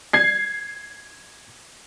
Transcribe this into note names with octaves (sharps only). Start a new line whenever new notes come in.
G#6 C7